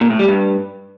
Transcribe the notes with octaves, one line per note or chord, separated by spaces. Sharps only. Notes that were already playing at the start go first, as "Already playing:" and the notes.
A#2
A2
G3
G2